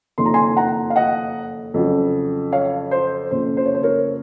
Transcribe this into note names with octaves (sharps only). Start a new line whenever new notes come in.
F#1 F2 D#3 C6
A#5
G#5 C6
F#5 A#5
F5
D#5 F#5
F2 C#3 F#3
C#5 F5
C5
F#1 F2 C#3 C5
C5
C#5
C5
A#4 C#5